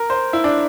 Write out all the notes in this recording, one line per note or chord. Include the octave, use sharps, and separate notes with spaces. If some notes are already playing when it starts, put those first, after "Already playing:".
Already playing: A#4
C5
E4
D4